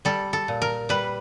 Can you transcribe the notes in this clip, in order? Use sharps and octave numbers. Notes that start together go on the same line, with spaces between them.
G3 A4
A4
A#2
A#4
G3 B4